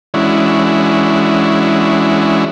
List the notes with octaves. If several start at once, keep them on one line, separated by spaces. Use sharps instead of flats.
E3 G#3 C#4 D4 E4 F#4